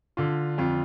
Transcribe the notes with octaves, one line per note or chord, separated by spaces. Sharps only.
D3 F4
F2 F4